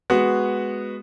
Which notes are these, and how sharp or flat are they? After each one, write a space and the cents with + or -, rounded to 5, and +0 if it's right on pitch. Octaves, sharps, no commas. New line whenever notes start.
G#3 +0 B3 +0 F#4 +0